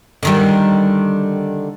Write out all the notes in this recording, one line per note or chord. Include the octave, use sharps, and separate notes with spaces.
D3 D#3 G3